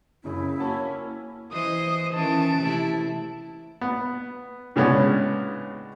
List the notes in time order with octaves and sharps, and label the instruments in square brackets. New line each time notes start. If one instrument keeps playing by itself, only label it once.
[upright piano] F#1 C#3 [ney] E4
[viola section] A#3 C#4 [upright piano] F#4 A5 B5
[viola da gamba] E3 C5 D#5 [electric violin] D#6
[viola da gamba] D#3 E3 C#4 [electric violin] A5 D7
[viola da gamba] C3 A3 E4
[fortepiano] B3
A2 C#3 G#3 B3 C#4 D4